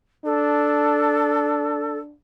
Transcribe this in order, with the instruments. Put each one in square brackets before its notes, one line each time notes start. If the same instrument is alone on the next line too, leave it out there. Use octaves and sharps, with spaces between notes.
[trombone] D4 [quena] A4